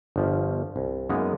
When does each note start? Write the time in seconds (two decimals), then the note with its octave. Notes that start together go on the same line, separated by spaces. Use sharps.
0.16 G1 F3
0.76 C2
1.09 F#2 G#3 A#3 B3 D#4